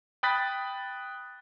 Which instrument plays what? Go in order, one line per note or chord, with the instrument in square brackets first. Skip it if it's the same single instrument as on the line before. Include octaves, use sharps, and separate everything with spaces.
[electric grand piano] G5 B5 D#6 F#6 A6 B6